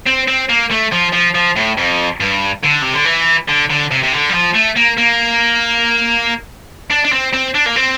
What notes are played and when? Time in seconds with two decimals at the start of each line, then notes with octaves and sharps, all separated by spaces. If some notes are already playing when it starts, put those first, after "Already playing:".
0.07 C4
0.28 C4
0.49 A#3
0.71 A3
0.92 F3
1.13 F3
1.35 F3
1.56 A2
1.78 F2
2.20 G2
2.63 D3
2.82 C3
2.94 D3
3.06 E3
3.49 D3
3.70 D3
3.91 C3
4.03 C3
4.13 D3
4.30 G3
4.34 F3
4.55 A3
4.77 A#3
4.98 A#3
6.90 D4
7.04 D4
7.12 C4
7.33 C4
7.55 D4
7.66 A#3
7.76 C4